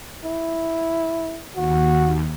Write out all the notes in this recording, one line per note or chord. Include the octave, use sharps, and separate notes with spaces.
E4
D#2 F#4